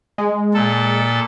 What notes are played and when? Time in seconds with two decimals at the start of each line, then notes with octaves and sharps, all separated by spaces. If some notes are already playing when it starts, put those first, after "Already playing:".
0.18 G#3
0.54 A#2 A4